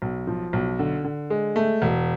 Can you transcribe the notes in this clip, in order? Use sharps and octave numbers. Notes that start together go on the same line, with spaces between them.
B1
F3
B1
D3
D3
G#3
A3
E1